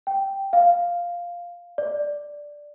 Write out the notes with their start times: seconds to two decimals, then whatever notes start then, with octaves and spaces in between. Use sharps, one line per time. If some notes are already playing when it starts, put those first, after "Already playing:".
0.07 G5
0.53 F5
1.78 D5